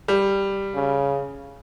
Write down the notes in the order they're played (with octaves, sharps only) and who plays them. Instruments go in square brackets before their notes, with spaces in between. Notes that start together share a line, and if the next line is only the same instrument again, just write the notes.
[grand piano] G3
[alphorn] C#3